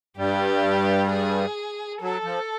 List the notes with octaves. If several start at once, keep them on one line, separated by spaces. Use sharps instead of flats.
G2 G3 G4
G#4
F#3 A4
F3